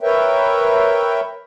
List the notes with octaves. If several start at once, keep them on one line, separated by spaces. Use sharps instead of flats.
A#4 B4 C#5 E5 G5